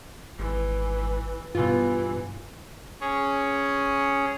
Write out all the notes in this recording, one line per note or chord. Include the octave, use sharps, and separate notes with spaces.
G#1 E3
G2 B2 E3 F4
C#4 G#4 C#5